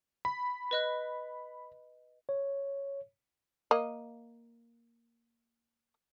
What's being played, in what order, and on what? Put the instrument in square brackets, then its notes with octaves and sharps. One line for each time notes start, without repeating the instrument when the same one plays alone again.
[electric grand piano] B5
[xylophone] B4 D#5 F#6
[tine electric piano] C#5
[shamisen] A#3 D#5